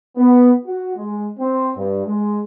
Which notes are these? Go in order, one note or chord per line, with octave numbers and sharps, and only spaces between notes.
B3
F#4
G#3
C4
G2
G#3